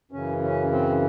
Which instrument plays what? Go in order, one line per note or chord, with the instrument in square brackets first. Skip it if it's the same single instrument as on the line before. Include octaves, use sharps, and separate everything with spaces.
[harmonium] F#2 C#3 E3 C#4
C#4
C4